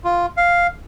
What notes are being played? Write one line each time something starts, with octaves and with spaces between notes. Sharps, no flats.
F4
F5